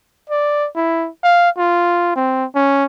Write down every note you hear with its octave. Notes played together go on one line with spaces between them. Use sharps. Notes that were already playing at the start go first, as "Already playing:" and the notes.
D5
E4
F5
F4
C4
C#4